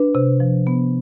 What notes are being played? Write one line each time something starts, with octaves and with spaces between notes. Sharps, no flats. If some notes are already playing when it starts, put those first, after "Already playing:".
Already playing: D4 B4
C3
F3
B3